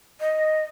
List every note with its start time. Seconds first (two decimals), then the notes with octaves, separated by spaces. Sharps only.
0.21 D#5